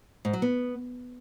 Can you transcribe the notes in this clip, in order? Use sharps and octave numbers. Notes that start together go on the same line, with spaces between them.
G#2
F#3
B3